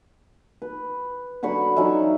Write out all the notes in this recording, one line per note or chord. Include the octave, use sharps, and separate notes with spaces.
B4
D3 F#3 B5 C#6
F#3 C#4 D#4 E5